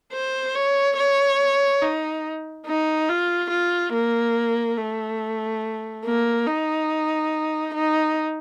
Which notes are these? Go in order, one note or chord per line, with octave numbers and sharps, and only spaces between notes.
C5
C#5
C#5
D#4
D#4
F4
F4
A#3
A3
A#3
D#4
D#4